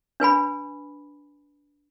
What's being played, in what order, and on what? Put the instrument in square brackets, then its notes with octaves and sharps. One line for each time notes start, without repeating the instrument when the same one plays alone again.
[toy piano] D4 B4 G#5 B5